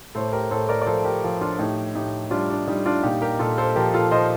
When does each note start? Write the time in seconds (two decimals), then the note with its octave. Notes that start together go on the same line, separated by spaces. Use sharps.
0.15 A2 A4 C5
0.33 G4 A#4
0.51 A2 A4 C5
0.69 A#4 D5
0.82 D5
0.86 F3 A4 C5
1.05 G4 A#4
1.24 F3
1.41 D4 F4
1.59 A2 D#4 G4
1.95 A2 D#4 G4
2.31 G3 D4 F4
2.50 D4
2.68 G3 D#4
2.86 D4 F4
3.03 A#2 D#4 G4
3.21 G4 A#4
3.39 A#2 F4 A4
3.58 A4 C5
3.76 F3 G4 A#4
3.94 F4 A4
4.11 F3 C5 D#5